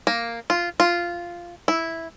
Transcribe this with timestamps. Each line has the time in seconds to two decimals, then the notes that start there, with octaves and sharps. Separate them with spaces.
0.07 A#3
0.50 F4
0.80 F4
1.68 E4